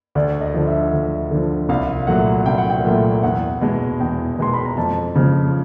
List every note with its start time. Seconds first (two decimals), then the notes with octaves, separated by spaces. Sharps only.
0.15 D2 D5
0.41 D#5
0.54 D3 F3
0.67 E5
0.93 D2
1.31 D3 F3
1.69 C2 F5
2.07 A#2 F#3 A3 F#5
2.46 C2 G5
2.58 F#5
2.70 G5
2.85 A#2 F#3 A3
3.23 E2 F#5
3.61 B2 G#3
4.00 E2 G5
4.39 B2 G#3 C6
4.54 B5
4.65 A#5
4.77 F2 A5
5.16 C#3 F3 G#3